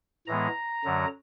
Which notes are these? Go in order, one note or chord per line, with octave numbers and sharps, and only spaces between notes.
A2 E3 G#3 B3 A#5
F#2 D3 F#3